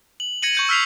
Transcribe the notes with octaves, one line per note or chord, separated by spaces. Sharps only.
F#7
G#6 A#6 C#7 D#7 F#7
C#6 G6 C#7
E6 F6 B6 C7 F7